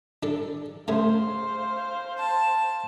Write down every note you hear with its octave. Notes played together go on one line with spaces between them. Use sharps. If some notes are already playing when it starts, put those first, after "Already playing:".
D4 A4
C#3 A3 G#4 C5 F5
A5